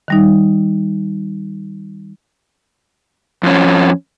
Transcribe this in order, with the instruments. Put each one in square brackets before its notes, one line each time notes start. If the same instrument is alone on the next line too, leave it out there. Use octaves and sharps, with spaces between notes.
[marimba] D#3 G3 D#4
[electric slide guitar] F2 C#4